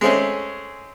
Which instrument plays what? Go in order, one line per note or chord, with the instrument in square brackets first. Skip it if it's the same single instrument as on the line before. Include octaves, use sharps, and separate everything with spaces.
[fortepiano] G#3 A3 C4 C#4